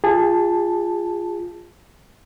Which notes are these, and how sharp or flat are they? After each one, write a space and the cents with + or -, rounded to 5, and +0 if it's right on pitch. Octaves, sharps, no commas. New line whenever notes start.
F4 +0 G#4 -25 A5 +0